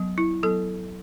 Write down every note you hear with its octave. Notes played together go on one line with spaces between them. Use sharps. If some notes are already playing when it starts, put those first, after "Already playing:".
Already playing: F#3 B3
E4
F#3 B3 A4